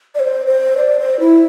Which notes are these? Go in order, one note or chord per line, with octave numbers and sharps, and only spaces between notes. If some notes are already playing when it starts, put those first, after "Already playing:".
D5
C5
C5
D5
C5
E4